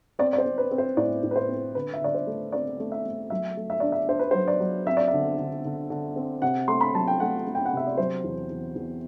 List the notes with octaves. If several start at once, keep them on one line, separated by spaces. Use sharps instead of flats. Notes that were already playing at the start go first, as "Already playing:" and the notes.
C4 D5
D5
C5
C4
B4
C4
C5
A2 D5
A2
B4
C5
C4
D3 B4
E5
D3 D5
C5
A3
C4 D5
A3
E5
A3
F#3 E5
A3
E5
D4 D5
E5
D4 C5
B4
C5
F#3
D5
F#3
C4 E5
D5
E5
D3
D3
D3
D3
C4
C3 F#5
A3 C6
B5
F#3 A5
G5
A3 F#5
A3
G5
F#5
C3 E5
D5
F#3 C5
E2
E2
E2